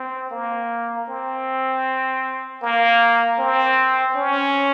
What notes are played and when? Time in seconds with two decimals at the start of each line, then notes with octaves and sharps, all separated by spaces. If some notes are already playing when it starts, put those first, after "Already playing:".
Already playing: C4
0.31 A#3
1.09 C4
2.62 A#3
3.39 C4
4.16 C#4